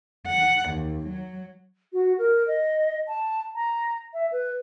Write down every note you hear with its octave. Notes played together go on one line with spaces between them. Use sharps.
F#5
D#2
F#3
F#4
A#4
D#5
A5
A#5
E5
B4